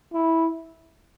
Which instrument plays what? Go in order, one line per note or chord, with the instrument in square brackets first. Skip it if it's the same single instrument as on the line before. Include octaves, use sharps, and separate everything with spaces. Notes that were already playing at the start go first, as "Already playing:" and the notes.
[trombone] E4